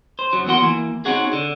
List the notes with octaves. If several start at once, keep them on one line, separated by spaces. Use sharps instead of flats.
C5
F#2 F#3
E2 A#3 F#4 C6
E3 A#3
C4 C#4 D#4 F#4 G#4
D3